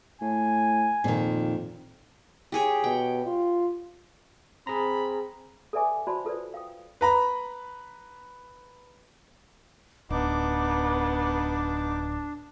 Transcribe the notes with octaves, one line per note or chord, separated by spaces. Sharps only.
A2 G#5
F2 A#2 D#3
G4 G#4 C#5
B2 G5
F4
C4 G#4 A#5 B5
A4 B4 D5 E5 G#5 D6
F#4 C5 D5 A5 B5 C6
F4 A4 B4 C5 D5
F5 G5 D#6
B4 A#5 B5
D1 B3 D4 D#4 D6